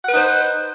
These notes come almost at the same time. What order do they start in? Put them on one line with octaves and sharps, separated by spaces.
F#5 B4 D#4 C5